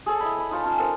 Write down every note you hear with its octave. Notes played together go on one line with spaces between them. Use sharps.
G#4 A4 C#5
E4 D#5 B5
D#5 B5
D#4 F4 C#5 A5
C#4 F4
A4 A#4 C5 F#5